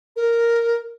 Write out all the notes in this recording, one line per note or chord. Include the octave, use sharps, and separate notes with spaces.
A#4